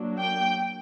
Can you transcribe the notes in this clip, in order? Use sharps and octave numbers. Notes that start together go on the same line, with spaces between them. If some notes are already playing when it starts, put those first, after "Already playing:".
Already playing: F#3 A#3 D4
G5